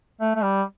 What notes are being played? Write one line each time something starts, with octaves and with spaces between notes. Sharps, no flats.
A3
A3
G3